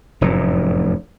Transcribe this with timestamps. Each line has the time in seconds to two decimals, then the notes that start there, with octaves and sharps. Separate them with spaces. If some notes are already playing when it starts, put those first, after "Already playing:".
0.21 F1 F#2 A2